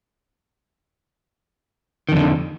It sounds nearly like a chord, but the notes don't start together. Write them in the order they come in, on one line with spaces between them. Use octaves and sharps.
D#3 F2 D3